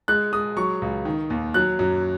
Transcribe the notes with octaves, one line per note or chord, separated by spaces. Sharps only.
G#3 F#6
G#3 D#6
F#3 C#6
C#2
D#3
D#2
F#3 F#6
F#2